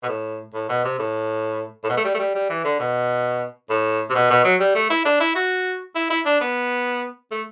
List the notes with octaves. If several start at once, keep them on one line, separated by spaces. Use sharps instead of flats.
B2
A2
A2
B2
C3
A2
A2
B2
A3
G3
A3
G3
G3
E3
D3
B2
A2
C3
B2
B2
F#3
G3
A3
E4
D4
E4
F#4
E4
E4
D4
B3
A3